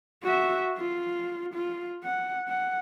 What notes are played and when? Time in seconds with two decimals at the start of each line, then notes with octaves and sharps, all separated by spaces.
0.23 F#4 E5
0.77 F4
1.54 F4
2.03 F#5
2.48 F#5